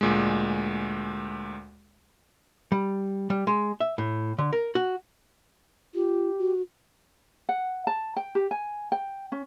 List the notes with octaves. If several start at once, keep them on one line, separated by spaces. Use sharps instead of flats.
D2 A#2 G#3
G3
G3
G#3
E5
A2
D3
A#4
F#4
F4 G4
F#4
F#5
A5
G5
G4
G#5
G5
C#4